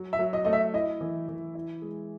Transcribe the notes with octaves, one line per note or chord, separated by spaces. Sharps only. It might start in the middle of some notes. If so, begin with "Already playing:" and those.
Already playing: F#3
E5
F#3
D#5
A3 D#5
E5
E4 D#5
E3
E3
E4
G#3